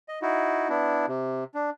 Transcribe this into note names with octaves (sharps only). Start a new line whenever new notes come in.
D#5
D#4 E4 F#4
B3 D4 E4
C3
D4